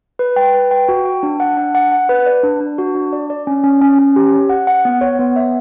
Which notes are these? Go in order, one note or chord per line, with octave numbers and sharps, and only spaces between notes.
B4
G5
B4
G5
F#4
G5
D4
F#5
D4
F#5
F#5
B4
D5
D4
D4
F#4
D4
D5
D5
C#4
C#4
C#4
C#4
G4
C#5
F#5
F#5
B3
C#5
B3
E5